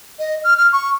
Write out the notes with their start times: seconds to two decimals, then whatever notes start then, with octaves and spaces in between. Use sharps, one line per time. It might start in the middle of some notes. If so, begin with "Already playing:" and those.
0.19 D#5
0.44 F6
0.57 F6
0.73 C#6